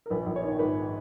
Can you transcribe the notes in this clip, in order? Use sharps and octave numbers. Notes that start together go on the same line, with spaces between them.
A#4
A#1 B4
A#1
C#5
D#3
G#2 B4